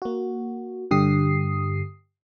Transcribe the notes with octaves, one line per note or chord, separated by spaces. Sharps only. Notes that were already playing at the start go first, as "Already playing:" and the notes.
A#3 F#4
G2 D3 G4 D#6 C7